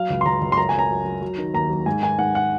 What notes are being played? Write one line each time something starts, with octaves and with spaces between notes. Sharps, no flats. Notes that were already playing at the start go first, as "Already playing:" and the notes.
Already playing: F#3 F5
C#2
C6
C#2 A#5
C#2
C6
F#2 A#5
G#5
F#2 A#5
F#3
F#3
F#3
D#3
D#2 A#5
F#3
G#2 G#5
D#3 G#5
G#2 F#5
F#5